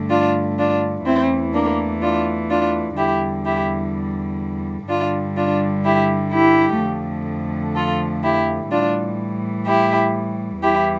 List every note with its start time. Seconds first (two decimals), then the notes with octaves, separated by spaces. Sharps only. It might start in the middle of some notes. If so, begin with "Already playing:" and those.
Already playing: G2 D3 A3
0.10 D4 F4
0.58 D4 F4
1.06 E2 E3 A3 C4 E4
1.54 A#3 D4
2.02 D4 F4
2.50 D4 F4
2.97 E2 D3 G3 E4 G4
3.45 E4 G4
4.88 G2 D3 G3 D4 F4
5.37 D4 F4
5.85 E4 G4
6.32 E4 G4
6.80 F2 D3 F3 A3
7.76 F4 A4
8.24 E4 G4
8.71 A2 E3 G3 D4 F4
9.67 E4 G4
10.63 E2 E3 G3 E4 G4